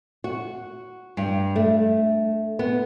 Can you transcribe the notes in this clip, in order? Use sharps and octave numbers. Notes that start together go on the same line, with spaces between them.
F#4
G2
A3
B3